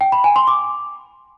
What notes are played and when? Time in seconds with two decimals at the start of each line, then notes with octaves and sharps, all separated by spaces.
0.01 G5
0.12 B5
0.24 G#5
0.36 C6
0.47 D6